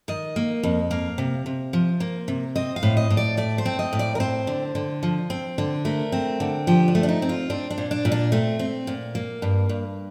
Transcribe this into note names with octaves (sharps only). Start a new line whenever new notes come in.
D#3 D#5
A#3
F2
A#3 F5
C3
C3
F3
A#3
C3
C4 D#5
F5
A2
D#5
A2
D5
A3 D5
C5
C4
D#5
A2
D5
A#4
C4 C5
D3
D3
F3
C4
D3
A3 A#4
C4
D3
F3 G4
D4
A3
D4
D#4
C4
F4
C4 D4
D4
A#2
D4
A#2
D4
A3 C4
C4
A#2
A#3
G2
G2